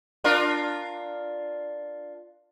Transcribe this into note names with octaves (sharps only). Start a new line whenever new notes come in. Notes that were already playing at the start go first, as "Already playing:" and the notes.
D4 F4 A#4